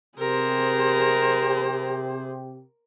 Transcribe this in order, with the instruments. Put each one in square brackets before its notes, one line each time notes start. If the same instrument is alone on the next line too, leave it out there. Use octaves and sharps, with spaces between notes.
[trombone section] C3 G4 [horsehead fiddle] G#4 C5 [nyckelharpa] A#4